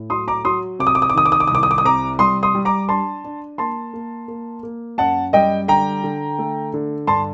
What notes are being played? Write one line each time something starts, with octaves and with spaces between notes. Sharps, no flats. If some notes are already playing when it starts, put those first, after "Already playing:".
Already playing: A2
F#3 C6 D#6
A#5 D6
F#3 C6 D#6
C3 D6
D#6
D6
D#6
D6
D#3 D#6
D6
D#6
D6
C2 D#6
D6
D#6
D6
D#6
C3 A#5 D6
G3 C6 D#6
C6 D#6
G3
A#5 D6
D4 A5 C6
D4
A#3 A5 C6
A#3
A#3
A#3
F#2 F#5 A5
G3 D#5 G5
D3 G5 A#5
D3
A3
D3
G2 A5 C6